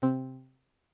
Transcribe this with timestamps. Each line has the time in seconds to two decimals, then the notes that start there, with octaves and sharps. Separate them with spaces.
0.02 C3 C4